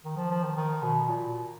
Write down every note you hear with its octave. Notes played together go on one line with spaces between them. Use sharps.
D#3
F3
F3
D#3
D#3
B2
A#2